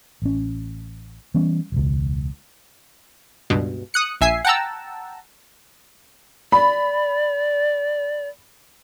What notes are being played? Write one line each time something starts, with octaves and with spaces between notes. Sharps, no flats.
A1 C#4
E3 G3 B3 C#4
E1 C#2
C#2 G2 B2
D#6 F#6 C#7
A#1 E5 G#5 C7
F#5 G5 A5 A#5 E6
D5 B5